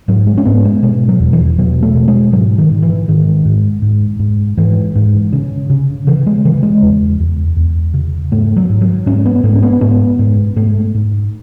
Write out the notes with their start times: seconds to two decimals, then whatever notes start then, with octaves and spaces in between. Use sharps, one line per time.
0.08 G#2 F#3
0.27 G#3
0.38 C#4
0.45 G#2 B3
0.65 G#3
0.82 B2 G#3
1.09 F#3
1.20 E2
1.33 E3
1.58 B2 F#3
1.83 A3
1.95 B2
2.08 G#3
2.33 G#2 F#3
2.58 D#3
2.71 G#2
2.82 E3
3.08 G#2 D#3
3.45 G#2
3.82 G#2
4.19 G#2
4.57 G#2 E3
4.95 G#2
5.33 C#3
5.70 C#3
6.07 C#3 E3
6.26 G#3
6.45 C#3 E3
6.63 G#3
6.82 E2
7.20 E2
7.56 E2
7.94 C#3
8.31 G#2 A3
8.56 F#3
8.70 G#2
8.81 F#3
9.06 G#2 C#4
9.26 B3
9.44 G#2 A3
9.55 C#4
9.62 B3
9.81 G#2 B3
10.19 G#2
10.56 G#2 A3
10.94 G#2